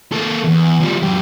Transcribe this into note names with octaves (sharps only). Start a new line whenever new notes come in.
A#3 A4
E2
F3 G3
F#2 G4